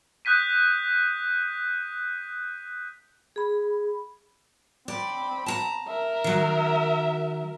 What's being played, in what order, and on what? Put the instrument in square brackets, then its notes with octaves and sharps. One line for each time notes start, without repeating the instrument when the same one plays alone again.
[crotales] D#6 F#6 G6 B6 D#7
[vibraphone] G#4 B5
[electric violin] C4 B5 [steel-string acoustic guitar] D5
[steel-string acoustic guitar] A5 A#5
[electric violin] A#4 E5
[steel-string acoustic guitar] D#3 F#3